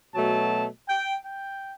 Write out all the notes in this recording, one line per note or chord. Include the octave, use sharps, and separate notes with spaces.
B2 F#3 A3 A5
G5
G5